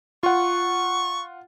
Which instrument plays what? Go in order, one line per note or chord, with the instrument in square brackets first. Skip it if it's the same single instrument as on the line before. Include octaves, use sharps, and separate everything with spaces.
[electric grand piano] F4 F#5 [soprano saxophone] C#6